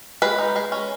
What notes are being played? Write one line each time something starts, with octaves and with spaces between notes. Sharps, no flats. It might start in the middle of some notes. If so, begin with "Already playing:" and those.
G#3 B4
D#4
G#3
C#4